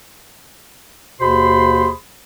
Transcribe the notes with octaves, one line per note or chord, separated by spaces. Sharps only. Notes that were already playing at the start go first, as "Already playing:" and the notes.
D#2 B2 G#4 C5 B5 C6